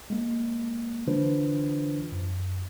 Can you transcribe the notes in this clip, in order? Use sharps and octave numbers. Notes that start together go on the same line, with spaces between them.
G#3 A#3
D3 E3 D4 F4 B4 C5
F#2